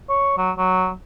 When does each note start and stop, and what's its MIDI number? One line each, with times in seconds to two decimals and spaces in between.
0.09 0.34 73
0.37 0.51 54
0.57 0.91 54